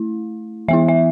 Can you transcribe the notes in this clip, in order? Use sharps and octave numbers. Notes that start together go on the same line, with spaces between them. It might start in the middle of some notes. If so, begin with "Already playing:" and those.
Already playing: A3 E4
E3 B3 E4 E5
E5